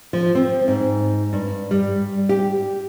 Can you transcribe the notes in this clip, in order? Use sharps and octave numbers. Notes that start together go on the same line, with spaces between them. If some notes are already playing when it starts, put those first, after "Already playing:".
F3
C4
G#2
G2
G3
G4